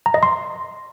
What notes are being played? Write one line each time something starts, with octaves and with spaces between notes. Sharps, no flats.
A#5
D#5
C6